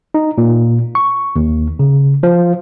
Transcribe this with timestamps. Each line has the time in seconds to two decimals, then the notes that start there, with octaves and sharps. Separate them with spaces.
0.14 D#4
0.38 A#2
0.95 C#6
1.36 D#2
1.79 C#3
2.23 F3